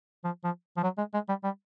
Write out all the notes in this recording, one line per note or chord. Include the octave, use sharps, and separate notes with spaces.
F3
F3
F3
F#3
G#3
G#3
G3
G3